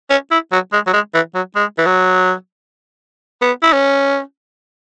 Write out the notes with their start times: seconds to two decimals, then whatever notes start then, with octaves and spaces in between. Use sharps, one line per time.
0.10 C#4
0.31 E4
0.52 F#3
0.73 G#3
0.87 F#3
0.93 G#3
1.14 E3
1.35 F#3
1.55 G#3
1.78 E3
1.86 F#3
3.42 B3
3.62 E4
3.73 C#4